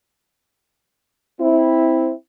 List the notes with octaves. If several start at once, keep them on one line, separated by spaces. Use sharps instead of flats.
C4 E4